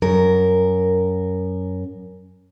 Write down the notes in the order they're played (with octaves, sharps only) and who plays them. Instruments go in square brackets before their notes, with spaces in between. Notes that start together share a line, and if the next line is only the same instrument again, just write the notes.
[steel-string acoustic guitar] F#2 A#4